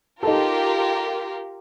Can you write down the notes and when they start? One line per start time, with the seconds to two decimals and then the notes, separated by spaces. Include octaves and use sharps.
0.23 D#4 F4 G4 A4 A#4